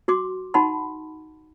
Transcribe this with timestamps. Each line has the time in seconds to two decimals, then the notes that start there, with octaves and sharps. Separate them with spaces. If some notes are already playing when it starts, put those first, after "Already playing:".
0.08 F#4 C6 D6
0.54 D#4 F#5 A5 B5 C6